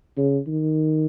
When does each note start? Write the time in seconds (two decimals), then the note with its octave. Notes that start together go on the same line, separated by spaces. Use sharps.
0.17 C#3
0.47 D#3